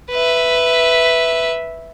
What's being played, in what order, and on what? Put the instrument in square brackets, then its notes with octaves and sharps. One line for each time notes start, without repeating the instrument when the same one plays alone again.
[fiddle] B4 E5